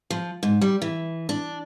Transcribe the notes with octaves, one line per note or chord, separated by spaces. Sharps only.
F3
G#2
G3
E3
D4